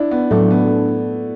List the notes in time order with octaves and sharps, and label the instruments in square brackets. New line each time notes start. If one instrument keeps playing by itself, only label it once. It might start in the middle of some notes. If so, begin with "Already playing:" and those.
Already playing: [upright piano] D4 E4
B3
[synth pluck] A2 F#3 D4 A4 D5 [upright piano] A3
[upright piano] B3